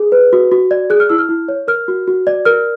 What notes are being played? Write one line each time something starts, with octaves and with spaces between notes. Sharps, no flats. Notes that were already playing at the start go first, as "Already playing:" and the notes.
Already playing: G#4
B4
F#4
F#4
D5
G#4 F#6
F6
E4 E6
F6
E4
C#5
A#4 F6
F#4
F#4
D5
A#4 F6